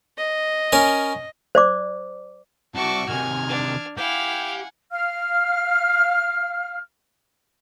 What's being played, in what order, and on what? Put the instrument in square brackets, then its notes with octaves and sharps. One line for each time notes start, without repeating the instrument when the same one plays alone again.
[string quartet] D#5
[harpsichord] C#4 A#4 G#5
[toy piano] C5 D5 D6
[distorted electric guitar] C2 E5 [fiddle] F#4 D6 [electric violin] A5 C#6
[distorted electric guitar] C3 D#3 [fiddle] G#5 [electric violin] F6 G#6
[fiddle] D4
[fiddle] E4 F5 [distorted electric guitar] G4 [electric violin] F#5 G#5
[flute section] F5 F6